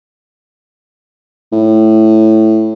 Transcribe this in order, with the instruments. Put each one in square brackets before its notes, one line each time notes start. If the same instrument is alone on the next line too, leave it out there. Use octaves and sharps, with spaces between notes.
[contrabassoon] A2